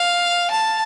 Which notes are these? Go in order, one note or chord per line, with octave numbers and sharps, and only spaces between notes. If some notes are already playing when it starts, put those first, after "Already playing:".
Already playing: F5
A5